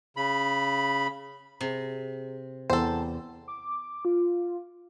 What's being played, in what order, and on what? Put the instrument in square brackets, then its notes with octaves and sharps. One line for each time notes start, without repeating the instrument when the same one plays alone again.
[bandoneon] C#3 B5
[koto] C3 [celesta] G#4 C5
[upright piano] E2 [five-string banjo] A4 C5 [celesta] F#5 G5 A#5
[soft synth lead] D6
F4